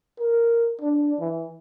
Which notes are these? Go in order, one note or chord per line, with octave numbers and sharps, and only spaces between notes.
A#4
D4
E3